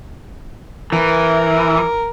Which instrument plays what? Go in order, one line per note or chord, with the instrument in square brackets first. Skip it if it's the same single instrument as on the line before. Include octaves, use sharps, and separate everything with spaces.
[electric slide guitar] E3 [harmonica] A#4